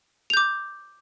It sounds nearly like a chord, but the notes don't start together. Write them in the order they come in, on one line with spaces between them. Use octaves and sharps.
F7 G6 D6